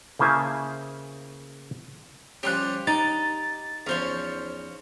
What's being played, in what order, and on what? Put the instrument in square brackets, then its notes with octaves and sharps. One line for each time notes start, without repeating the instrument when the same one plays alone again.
[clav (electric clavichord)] C#3 A#3 E4 C5 G#5 A5
[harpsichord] F3 G3 C#4 [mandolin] G4 C6 F#6
[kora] D#4 [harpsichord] D5 [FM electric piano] A6
[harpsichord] E2 F3 [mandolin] C#4 C5 C#5